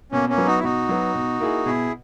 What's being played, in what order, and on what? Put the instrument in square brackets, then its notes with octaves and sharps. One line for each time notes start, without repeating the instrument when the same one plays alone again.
[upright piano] B2 [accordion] A#3 C#4
[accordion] A#3 C#4
[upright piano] F#3 B3
[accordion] D#4 F#4
E4
[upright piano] B2 [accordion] D#4 F#4
[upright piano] F#3 B3
B2
A#3 E4 G#4
[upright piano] B2 [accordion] E4 G#4